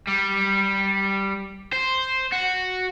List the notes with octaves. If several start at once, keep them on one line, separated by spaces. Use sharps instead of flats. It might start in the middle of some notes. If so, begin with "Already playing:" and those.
G3
C5
F#4